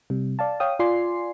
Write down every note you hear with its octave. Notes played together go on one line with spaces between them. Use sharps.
C3 G3
D5 F5 A5
C#5 F5 G5 D#6
F4 D5 G#5 C6 C7